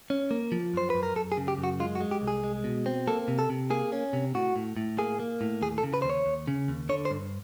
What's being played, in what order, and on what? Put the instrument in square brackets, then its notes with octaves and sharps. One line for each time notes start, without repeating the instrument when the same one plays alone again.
[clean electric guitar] C#4
A#3
F3
F#2 C5
F#2 B4
A#4
F#2 A4
G#4
C#3
G4
F#2
F#4
G#3 F4
F#4
G#3
G4
C2
G#4
G#3
B2
C4
A#3 A4
C3
A4
C3
A#3 G#4
C#4
C3
A2 F#4
A2
A2
A#3 G#4
A#3
A2
D#2 G#4
A4
C#3
B4
D#2 C5
C#5
D#2
C#3
D#2
D3 C#5
C5
G2